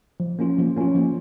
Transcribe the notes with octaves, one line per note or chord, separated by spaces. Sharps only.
F3
A#3 C#4 F4
F3
A#3 C#4 F4
F3